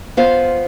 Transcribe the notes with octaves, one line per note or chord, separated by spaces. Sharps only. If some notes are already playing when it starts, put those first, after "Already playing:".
B3 F4 C5 F5